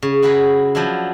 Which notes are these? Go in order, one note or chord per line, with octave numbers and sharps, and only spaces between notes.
C#3
E4 F#4 G#4 A#4 B4
F3 F#3 D4 E4